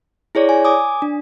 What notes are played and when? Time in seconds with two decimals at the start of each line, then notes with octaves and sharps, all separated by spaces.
0.35 E4 G#4 C#5 D5
0.49 G#5
0.65 G#5 D6 D#6
1.02 D4